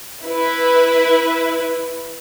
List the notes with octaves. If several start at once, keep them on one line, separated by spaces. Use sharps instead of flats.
E4 B4